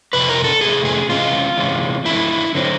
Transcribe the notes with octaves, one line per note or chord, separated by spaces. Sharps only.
F2 C3 B4
A#4
A4
F2 C3 E3 A3 G#4
G#4
C3 E3 G#3 C#4 F4
C3 E3 G#3 C#4
F2 D3 F#3 A3 C4 E4
D3 F#3 A3 C4